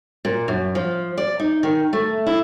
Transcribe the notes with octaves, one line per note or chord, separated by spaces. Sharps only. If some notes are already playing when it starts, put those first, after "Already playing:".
A#2
F#2
F3
D5
D#4
D#3
A3
E4